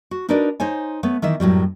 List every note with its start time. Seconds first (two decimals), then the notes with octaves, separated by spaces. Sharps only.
0.11 F#4
0.29 D4 D#4 F#4 A#4 B4 D5
0.60 D#4 C5 C#5 G#5
1.03 A3 B3 C#5
1.22 D#3 E3 D#5 E5
1.40 F#2 A2 F#3 G3